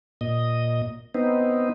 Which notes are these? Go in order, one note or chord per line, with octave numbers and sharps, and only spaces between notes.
A#2 D#5
B3 C4 D#4